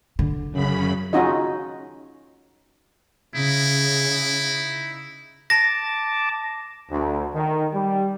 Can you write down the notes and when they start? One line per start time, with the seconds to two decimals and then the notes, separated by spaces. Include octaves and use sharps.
0.19 D3
0.51 F#2 C#3 B5
1.13 C#4 D#4 F4 F#4 D#5
3.32 C#3 D#4 E4
5.50 A5 D6 A#6
6.90 D2
7.35 D#3
7.73 G3